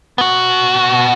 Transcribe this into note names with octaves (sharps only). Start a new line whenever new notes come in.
B3 F#4